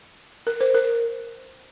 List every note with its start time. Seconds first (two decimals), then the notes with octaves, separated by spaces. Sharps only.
0.47 A#4
0.61 C5
0.74 A#4